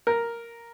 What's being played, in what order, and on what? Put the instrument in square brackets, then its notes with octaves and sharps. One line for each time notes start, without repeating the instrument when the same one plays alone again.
[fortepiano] A#4